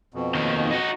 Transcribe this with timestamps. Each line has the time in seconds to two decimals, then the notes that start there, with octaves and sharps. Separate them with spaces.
0.14 F2 B2
0.35 D#2 D#3
0.71 D#4 F#4